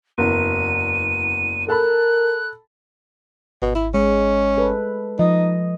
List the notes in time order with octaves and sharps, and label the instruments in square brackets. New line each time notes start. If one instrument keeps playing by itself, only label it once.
[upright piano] F#1 E2 [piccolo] D#7
[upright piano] A4 A5 B5 [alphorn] A#4 [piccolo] F#6
[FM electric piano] G#1 [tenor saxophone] B2
[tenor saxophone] E4
[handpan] G#3 [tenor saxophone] C#4
[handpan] A4 B4
[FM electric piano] F3 [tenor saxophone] D#4 [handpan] D#5